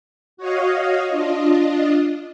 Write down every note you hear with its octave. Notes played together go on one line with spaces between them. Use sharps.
F#4 C#5 D#5 F5
D4 F4 D#5